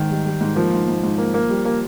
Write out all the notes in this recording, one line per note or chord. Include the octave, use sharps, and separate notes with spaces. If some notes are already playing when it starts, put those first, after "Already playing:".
Already playing: G#2 D#3
G3
G3
G#2
F3 A#3
G#2
G#2
G#2
A#3
A#3
G3
A#3